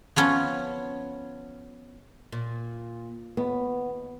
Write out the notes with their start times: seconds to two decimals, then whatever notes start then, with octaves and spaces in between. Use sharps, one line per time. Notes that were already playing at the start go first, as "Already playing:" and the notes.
0.16 F3 B3 C#4
2.32 A#2
3.37 D#2 B3